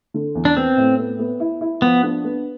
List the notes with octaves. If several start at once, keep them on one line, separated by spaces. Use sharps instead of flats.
D3
E2
D4
B3 C4
A2
B3
B3
E4
E4
F3 B3
D4
B3